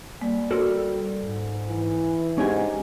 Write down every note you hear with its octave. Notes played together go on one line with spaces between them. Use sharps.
G3 A#3
F#4 A4 A#4 C5
G#2
E3
G#2 C#4 D#4 G4 G#5